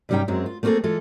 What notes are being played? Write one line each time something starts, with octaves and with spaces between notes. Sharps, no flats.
G2 C3 G3 C#4 D#4 G5
F#2 F#3 G#3 C4
F4
A3 A#3 C4 F4 G#4 A4
E3 G#3 F4 A4